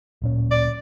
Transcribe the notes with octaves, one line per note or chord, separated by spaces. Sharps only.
D1 A#2 C#4
D5